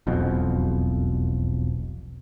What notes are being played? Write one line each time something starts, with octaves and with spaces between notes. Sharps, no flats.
E1 B1 F2 B2